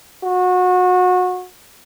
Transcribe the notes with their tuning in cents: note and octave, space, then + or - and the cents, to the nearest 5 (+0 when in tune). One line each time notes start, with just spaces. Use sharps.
F#4 -25